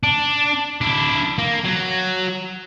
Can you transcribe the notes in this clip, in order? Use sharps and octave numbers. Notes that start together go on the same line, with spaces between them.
D4
D4 E4
A#3
F#3